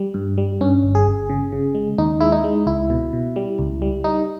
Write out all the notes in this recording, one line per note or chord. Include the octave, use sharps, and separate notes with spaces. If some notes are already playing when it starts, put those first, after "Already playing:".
Already playing: G3
G2
G3
G2 C#4
G1
G#4
G1
C#3
C#3
G#3
D#2 D#4
G#3 E4
D#4
G#3
C#2 E4
B2
B2
G3
C#2
G3
G3 D#4